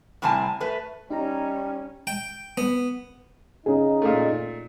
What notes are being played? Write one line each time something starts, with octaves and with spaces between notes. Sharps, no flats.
A2 C3 G3 C4 G#5 A5
A3 B4
G3 C#4 D#4 A#5
G5
B3
C#4 D#4 G#4
A#2 A3